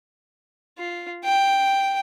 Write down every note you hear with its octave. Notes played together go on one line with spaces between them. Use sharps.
F4
G5